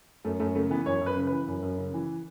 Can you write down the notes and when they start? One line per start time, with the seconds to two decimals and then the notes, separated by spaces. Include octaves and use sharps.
0.25 F#2 A3
0.40 F#2 A3
0.55 C#3 A3
0.71 E3 B3
0.86 F#2 C#5
1.01 F#2
1.06 B4
1.17 C#3
1.27 E3 B4
1.47 F#2
1.62 F#2
1.78 C#3
1.94 E3